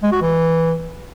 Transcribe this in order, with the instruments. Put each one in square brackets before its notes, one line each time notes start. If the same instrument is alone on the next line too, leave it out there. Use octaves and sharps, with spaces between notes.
[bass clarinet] G#3
F#4
E3